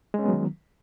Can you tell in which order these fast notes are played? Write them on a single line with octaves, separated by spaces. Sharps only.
G#3 C#4 B3 F#3 D#3